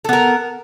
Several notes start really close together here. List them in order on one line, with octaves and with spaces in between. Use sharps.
A4 B3 A#4